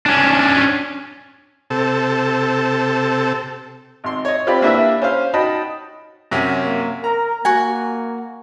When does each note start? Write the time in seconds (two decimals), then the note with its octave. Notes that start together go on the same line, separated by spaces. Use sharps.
0.06 C#4 D4
1.70 C3 A4
4.04 G#1 C6
4.25 C#5 D#5
4.47 C4 F4 G4 D5 B5
4.62 A#3 D4 E4 G4 B4 E5
5.02 C#4 C5 F5
5.34 D#4 F#4 D#5 G5 A5 B5
6.31 F#2 C3 C#4
6.64 A#3
7.04 A#4 A#5
7.45 A#3 F#4 G#5